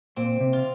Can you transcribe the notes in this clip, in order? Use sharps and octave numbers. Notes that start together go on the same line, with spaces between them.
A#2 C4
C3
F4